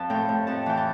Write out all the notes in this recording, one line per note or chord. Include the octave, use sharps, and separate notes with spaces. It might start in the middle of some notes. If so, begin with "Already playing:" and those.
Already playing: F2 F3 A5
A2 G5
A2
F2 A5
E3 G5
A5